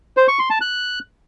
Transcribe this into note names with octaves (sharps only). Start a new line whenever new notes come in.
C5
C#6
C6
A5
F#6